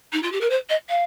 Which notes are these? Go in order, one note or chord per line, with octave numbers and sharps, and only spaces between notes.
D#4
F4
G4
A#4
C5
D#5
F5